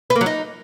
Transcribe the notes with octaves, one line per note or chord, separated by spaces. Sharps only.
B4
A#3
F#3
D#4